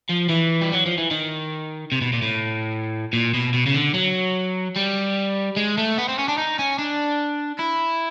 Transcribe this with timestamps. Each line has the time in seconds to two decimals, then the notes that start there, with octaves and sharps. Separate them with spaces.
0.10 F3
0.29 E3
0.62 G3
0.73 F#3
0.86 F3
0.98 E3
1.11 D#3
1.92 C3
2.01 B2
2.13 A#2
2.22 A2
3.13 A#2
3.34 B2
3.54 B2
3.66 C#3
3.74 D3
3.94 F#3
4.76 G3
5.57 G#3
5.78 A3
5.98 B3
6.08 C4
6.18 C#4
6.28 D4
6.38 D#4
6.59 C#4
6.78 D4
7.59 E4